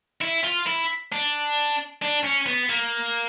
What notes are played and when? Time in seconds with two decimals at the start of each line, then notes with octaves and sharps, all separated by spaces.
0.22 E4
0.44 F4
0.67 E4
1.12 D4
2.02 D4
2.24 C#4
2.47 B3
2.70 A#3